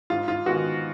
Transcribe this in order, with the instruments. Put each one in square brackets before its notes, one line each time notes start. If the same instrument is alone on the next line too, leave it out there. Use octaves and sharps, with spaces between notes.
[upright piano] G#2 F4
F4
D#3 G#3 B3 F#4